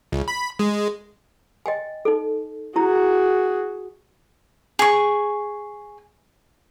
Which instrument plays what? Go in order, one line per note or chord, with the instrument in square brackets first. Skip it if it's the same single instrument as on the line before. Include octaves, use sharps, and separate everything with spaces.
[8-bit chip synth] C#2
B5
G#3
[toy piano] D#5 G5 G#5
D#4 A4
[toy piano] E4 A#5 [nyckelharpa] F#4 G#4
[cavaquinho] G#4 C#6